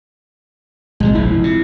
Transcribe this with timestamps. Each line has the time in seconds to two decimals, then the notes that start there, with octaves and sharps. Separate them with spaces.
1.00 A#1 C3 F#3 G#3
1.14 F1 F3 E4
1.44 C3